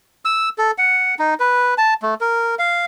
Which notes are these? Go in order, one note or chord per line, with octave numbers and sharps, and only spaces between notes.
E6
A4
F#5
D#4
B4
A5
A3
A#4
F5